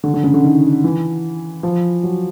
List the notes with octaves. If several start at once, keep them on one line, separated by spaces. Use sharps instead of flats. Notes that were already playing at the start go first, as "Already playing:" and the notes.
D3
D3
C#3
D3
D#3
E3
F3
F#3